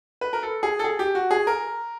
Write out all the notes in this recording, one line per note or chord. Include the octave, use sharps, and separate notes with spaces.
B4
A#4
A4
G#4
A4
G#4
G4
F#4
G#4
A#4